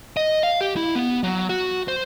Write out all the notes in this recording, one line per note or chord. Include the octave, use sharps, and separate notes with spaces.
D#5
F5
G4
E4
B3
F#3
F#4
C5